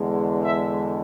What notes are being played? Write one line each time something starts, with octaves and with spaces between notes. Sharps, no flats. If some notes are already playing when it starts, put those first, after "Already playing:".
Already playing: E2 D3 G#3
E5